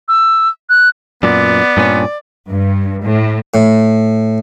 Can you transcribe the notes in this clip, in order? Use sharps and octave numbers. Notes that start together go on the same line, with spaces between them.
E6
F#6
F#2 A#2 B3 D5
G2 A#2 C#4
G2
A2
A2